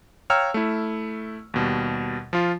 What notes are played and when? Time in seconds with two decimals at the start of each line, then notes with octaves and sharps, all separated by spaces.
0.30 C#5 F5 G5 A#5 E6 F6
0.54 A3 E4
1.54 D#2 B2 G3
2.33 F3 F4